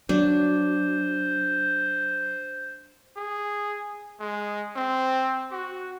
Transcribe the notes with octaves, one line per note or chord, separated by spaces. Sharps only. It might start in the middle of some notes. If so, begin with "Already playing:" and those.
F#3 D4 C5
G#4
G#3
C4
F#4